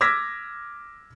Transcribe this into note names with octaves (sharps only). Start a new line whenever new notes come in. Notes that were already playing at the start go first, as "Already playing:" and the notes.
D6 E6 F6 G#6 A#6 B6